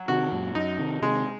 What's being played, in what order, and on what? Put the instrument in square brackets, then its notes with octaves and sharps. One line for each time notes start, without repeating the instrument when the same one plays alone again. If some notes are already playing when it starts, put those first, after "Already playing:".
Already playing: [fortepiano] F#3
[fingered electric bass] C3 D#3 [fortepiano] F#4
[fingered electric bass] F#2 A#2
[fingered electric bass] F#2 [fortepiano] D#4
[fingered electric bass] C3 D#3
[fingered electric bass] C3 D#3 [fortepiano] G#3